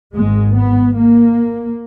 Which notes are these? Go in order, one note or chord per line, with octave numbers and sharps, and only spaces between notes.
G#1 G#2 G#3
B3
A#3